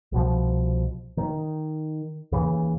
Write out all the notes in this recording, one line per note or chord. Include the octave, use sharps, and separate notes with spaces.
C2 B2 F3
D#3
D#2 C#3 E3